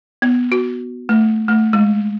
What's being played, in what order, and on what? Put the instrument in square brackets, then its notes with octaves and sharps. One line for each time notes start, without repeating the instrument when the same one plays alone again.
[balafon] B3
F#4
A3
A3
G#3